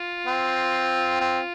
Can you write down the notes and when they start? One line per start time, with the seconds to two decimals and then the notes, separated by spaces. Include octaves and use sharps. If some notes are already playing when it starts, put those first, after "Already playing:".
Already playing: F4
0.27 C4
1.21 C4